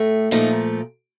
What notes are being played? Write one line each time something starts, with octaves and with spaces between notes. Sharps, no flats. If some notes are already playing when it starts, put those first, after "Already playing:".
Already playing: A2 A3
A#2 F3 A3 D#4